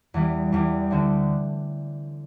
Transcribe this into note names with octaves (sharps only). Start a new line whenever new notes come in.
E2 E3 G3
E2 E3 G3
D2 D3 C4 A4